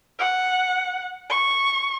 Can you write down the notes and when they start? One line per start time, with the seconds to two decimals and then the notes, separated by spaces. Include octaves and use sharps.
0.19 F#5
1.30 C#6